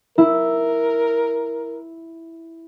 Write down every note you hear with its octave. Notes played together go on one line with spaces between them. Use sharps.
E4 A#4